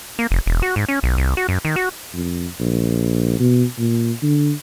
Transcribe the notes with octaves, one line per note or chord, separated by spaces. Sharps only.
A#3
F1
E1
F#4
G#2
C#4
B1
C2
F#4
F#2
D#3
F#4
F2
A#1
B2
A#2
D3